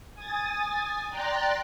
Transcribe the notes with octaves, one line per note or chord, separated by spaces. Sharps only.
G#5 D#6 A6
D5 G5 A#5 C6 F#6 A6